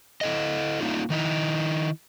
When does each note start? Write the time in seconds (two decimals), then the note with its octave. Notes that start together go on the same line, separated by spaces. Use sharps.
0.21 E4 A4 D#5
0.81 A#3 D4 D#4 F4
1.10 D#3 D#4 E4